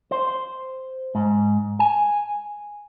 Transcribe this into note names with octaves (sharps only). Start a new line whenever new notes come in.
C5
G#2
G#5